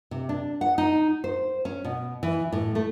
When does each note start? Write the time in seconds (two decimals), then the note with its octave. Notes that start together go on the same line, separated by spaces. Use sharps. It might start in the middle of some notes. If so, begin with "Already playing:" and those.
0.11 C3
0.29 D4
0.61 F#5
0.78 D#4
1.24 C5
1.65 C#4
1.84 B2
2.23 E3
2.53 A2
2.75 A3